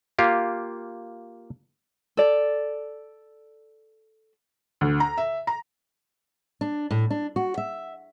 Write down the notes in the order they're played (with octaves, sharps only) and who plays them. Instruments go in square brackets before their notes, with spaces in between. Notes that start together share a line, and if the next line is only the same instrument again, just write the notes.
[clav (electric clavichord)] A#3 F4 G4
[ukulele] A4 D5
[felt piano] D2
A#5
E5
A#5
[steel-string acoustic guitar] D4
A2
D4
F#4
E5